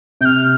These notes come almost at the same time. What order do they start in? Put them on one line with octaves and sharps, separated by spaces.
C3 G6 F6